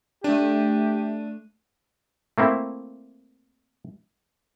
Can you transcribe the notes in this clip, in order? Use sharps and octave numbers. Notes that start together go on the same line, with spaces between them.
A3 D4 G4 D#7
A3 A#3 C4 E4